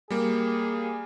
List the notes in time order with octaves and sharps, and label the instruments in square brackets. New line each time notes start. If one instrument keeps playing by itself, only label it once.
[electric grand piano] G3 A#3 [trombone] G#4